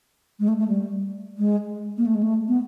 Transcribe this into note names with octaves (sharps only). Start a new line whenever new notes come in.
G#3
A3
A3
G3
G#3
A#3
A3
G#3
A3
B3